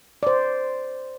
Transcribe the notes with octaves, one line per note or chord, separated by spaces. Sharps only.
C5 D5